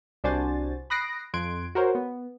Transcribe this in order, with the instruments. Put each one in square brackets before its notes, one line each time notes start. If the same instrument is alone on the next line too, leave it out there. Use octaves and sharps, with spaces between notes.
[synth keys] C2 D4 F#4 C5 G#5 A6
B5 D#6 F#6 A#6 C7 D7
F2 C6 F#6 G#6 D7
F#4 A#4 C5 C#5
B3